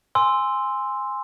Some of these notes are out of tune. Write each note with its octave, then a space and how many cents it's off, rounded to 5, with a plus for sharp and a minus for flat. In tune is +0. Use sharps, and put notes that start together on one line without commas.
G#5 -10 C6 +0 E6 +0